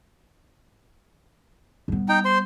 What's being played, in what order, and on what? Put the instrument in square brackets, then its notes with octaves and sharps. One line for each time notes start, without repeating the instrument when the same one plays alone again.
[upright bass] G3 B3
[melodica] D#4 G5
C5 C6